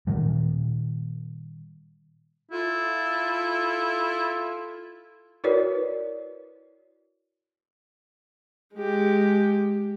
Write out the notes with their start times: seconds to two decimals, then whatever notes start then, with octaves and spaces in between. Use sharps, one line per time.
0.07 A#2 D#3 G3
2.52 E4 F4 A4
5.44 E4 F#4 A#4 B4 C#5 D5
8.75 G#3 G4